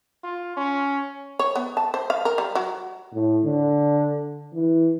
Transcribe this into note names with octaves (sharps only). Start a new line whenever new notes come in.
F4
C#4
C#5
B3
A5
C5
F5
A#4
G3
F#3
A2
D3
E3